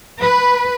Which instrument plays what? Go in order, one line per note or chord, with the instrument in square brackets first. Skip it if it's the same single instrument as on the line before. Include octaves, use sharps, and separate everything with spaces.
[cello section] B4